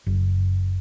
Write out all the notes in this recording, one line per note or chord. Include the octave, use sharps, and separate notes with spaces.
F#1